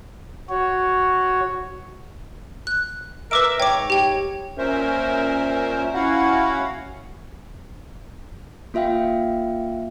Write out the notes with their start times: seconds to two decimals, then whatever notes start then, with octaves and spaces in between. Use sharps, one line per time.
0.49 F#4 C#5
2.67 F#6
3.31 A#4 B4 E5 D6 D7
3.60 G#2 D#4 C#5 G5 D6
3.90 G4 G5
4.58 A#2 C#4 A#4 C5 E5
5.94 C#4 E4 F#4 F5 F#5
8.74 A#3 F4 E5 F5 G5